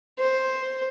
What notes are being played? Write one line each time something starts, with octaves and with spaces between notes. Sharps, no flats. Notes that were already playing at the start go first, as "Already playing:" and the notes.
C5